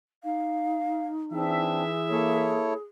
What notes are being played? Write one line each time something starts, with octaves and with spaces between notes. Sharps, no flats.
D#4 F5
E3 C4 D4 G#4 E5
A#3 E4 A4 C#5